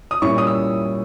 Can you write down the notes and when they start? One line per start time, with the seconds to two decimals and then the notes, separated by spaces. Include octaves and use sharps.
0.11 D#6
0.22 A#2 G3 C#4 E4 C#6
0.38 D#6
0.47 E6